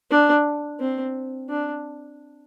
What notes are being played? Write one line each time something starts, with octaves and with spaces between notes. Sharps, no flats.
D4
C4
D4